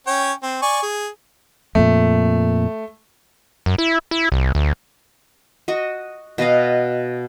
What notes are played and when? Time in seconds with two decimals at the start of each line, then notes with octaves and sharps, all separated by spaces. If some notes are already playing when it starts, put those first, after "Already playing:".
0.07 C#4 C#5 G5
0.43 C4
0.62 D5 G#5 C#6
0.82 G#4
1.75 F2 A#2 A3
3.66 F#2
3.78 E4
4.11 E4
4.32 C2
4.55 D2
5.68 F#4 D#5 C#6
6.38 B2 F#4 D#5 F5